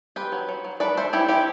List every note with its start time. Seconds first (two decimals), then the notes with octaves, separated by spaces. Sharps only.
0.16 C4 G4 B4
0.32 F#3
0.49 F#3
0.64 F#3
0.80 A3 B4 D5
0.97 A3 C5 E5
1.13 A3 E4 G4
1.29 C4 E4 G4